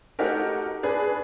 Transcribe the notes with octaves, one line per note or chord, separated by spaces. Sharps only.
A3 D#4 F#4 G4 A#4
D4 G#4 B4